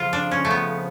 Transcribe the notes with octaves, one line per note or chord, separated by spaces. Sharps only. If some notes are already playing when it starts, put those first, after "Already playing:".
Already playing: F2 C#3 F3 F4
D4
C#4
A3
B3